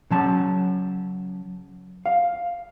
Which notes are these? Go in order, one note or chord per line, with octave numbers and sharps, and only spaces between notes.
C#3 F#3 A5
F5